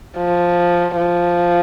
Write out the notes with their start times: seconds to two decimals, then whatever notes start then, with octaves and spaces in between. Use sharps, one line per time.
0.18 F3
0.97 F3